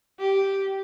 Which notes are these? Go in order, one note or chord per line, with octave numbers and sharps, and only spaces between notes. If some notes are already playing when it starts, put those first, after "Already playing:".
G4